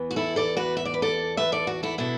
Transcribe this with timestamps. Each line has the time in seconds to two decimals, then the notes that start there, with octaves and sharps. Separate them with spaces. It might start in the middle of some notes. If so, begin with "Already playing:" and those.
Already playing: E2 E3 B3
0.11 F#4
0.16 E4 A4
0.36 A4 D5
0.57 F#4 B4
0.77 E5
0.85 D5
0.94 B4
1.02 A4 D5
1.37 B4 E5
1.52 A4 D5
1.67 F#4
1.83 E4 A4
1.98 B2 B3 D4 E4 A4